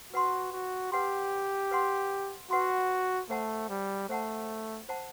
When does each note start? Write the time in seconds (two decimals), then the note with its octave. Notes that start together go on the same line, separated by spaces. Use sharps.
0.13 F#4 B4 F#5 C6
0.52 F#4
0.92 G4 B4 F#5 C6
1.71 B4 F#5 C6
2.51 F#4 B4 F#5 C6
3.30 A3 C5 F#5 A5
3.69 G3
4.09 A3 C5 F#5 A5
4.89 C5 F#5 A5